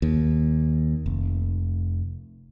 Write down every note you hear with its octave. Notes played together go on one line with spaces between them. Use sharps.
D#2
F1